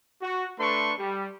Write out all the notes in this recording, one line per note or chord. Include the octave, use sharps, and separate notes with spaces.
F#4
A3 D4 B4 C6 C#6
G3